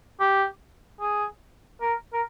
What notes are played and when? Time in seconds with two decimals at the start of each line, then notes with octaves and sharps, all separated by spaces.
0.20 G4
1.00 G#4
1.81 A#4
2.13 A#4